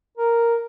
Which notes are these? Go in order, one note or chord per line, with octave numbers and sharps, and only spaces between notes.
A#4